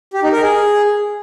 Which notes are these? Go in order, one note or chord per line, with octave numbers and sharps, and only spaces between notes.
G4
D#4
A#4
G#4